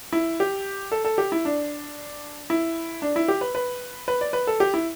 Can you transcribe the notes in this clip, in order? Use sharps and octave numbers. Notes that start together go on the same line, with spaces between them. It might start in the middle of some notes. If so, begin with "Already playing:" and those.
E4
G4
A4
A4
G4
E4
D4
E4
D4
E4
G4
B4
B4
B4
D5
B4
A4
G4
E4